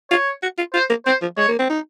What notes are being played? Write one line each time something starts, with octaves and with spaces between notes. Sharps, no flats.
F4 C#5
F#4
F4
F4 C5
A#3
C4 C5
F3
G#3 C#5
A#3
C4
D#4